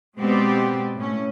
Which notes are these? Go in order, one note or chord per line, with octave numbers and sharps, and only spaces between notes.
B2 G#3 B3 C4 G4 D5
A2 C#4